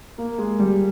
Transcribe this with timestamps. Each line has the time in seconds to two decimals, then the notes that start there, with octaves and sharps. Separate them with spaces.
0.18 A#3
0.38 G#3
0.59 G3